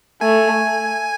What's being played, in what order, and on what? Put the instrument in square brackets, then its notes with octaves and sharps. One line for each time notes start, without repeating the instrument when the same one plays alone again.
[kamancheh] A3 [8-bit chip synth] G#5